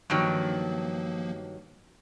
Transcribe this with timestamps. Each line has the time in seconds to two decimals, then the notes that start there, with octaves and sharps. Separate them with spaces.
0.10 G2 D#3 F3 F#3 A#3